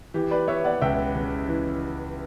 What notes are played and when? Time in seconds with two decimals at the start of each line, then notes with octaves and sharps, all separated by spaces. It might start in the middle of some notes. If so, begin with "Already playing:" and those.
0.14 E3 G4
0.31 B4 D5
0.47 B3 C#5 E5
0.64 D5 F#5
0.81 C#2 E5 G5
1.15 C#3
1.49 E3